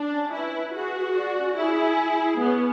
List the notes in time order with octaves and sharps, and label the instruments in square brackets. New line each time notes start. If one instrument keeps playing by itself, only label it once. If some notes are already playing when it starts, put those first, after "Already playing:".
Already playing: [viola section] D4
[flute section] C#4
[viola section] E4 [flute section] B4
[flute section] B4
[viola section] F#4 [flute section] G#4
[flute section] G#4
D5
C#4
[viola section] E4 [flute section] G#4
[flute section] G#5
G#4
G#4
[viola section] B3 [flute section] C#4